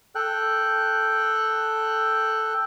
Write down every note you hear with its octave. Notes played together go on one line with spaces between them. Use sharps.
A4 G5 F#6